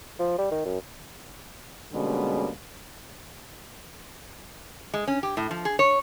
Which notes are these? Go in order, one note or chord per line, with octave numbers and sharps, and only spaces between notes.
F3
G3
D#3
F#2
B2 D3 G3 G#3 A#3 C#4
G#3
C#4
G4
A2
F3
G#4
C#5